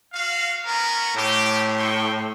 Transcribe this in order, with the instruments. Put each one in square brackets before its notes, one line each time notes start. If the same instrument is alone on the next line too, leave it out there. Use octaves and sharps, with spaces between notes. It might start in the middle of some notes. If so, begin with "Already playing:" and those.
[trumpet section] F#4 F5
B3 C#4 A#4
[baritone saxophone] A2 [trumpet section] G4
[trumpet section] G5 C6 C#6